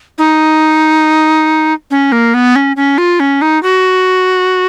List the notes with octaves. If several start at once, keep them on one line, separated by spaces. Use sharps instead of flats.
D#4
C#4
A#3
B3
C#4
C#4
F4
C#4
D#4
F#4